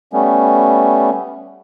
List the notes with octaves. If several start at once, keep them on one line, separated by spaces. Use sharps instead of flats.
G3 A3 B3 C#4